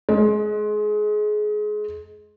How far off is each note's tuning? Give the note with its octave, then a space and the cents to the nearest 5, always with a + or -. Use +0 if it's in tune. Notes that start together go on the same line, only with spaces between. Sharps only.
G#3 +25 D#5 +10